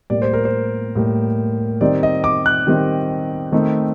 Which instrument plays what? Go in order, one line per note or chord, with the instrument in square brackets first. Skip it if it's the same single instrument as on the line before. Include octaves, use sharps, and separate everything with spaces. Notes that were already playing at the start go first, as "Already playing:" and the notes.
[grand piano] A2 G3 A#3 D5
C5
A#4
C5
A2 G3 A#3
D#3 G3 C4 D#4 D5
D#5
D6
F#6
D#3 G3 C4 D#4
D#3 A3 C4 D#4